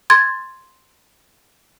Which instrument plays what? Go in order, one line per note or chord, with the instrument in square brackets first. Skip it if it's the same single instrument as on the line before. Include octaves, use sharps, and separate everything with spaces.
[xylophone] C6 G#6 A6